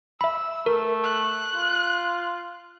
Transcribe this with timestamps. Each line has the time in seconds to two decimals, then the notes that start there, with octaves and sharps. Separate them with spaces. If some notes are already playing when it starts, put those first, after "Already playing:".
0.21 E5 B5 E6
0.66 A3 A#4
1.04 F#6
1.56 F4